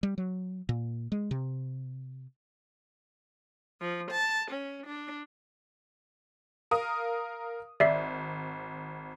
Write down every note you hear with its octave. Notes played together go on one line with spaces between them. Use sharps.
G3
F#3
A#2
G#3
C3
F3
A5
C#4
D4
A#4 F5 D#6
G#1 D5 E5 C7